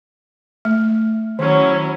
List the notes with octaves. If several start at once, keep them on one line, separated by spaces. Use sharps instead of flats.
A3
D#3 F#3 C#4 E4